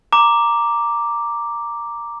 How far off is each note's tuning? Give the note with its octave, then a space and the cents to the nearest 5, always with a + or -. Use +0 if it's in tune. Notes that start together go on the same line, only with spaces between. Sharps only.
A#5 +0 D6 +0